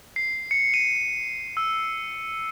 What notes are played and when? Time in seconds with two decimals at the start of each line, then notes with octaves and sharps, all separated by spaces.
0.16 C7
0.51 C#7
0.74 D#7
1.57 E6